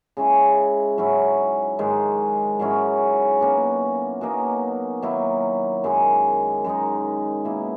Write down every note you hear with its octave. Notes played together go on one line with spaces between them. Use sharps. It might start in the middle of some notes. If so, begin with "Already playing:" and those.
C#3 G#3 C#4 E4
G#2 F#3 C#4 E4
G#2 D#3 G#3
G#2 F#3 C#4 E4
B2 A#3 C#4 F#4
B2 F#3 A#3 D#4
D#3 F#3 A#3 E4
F#2 D#3 G#3
F#2 D#3 G#3 D#4
B2 A#3 E4